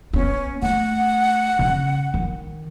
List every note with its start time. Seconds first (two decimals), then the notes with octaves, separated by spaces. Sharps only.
0.13 B3 C#4
0.62 A3 F#5
1.59 C#3
2.14 D#3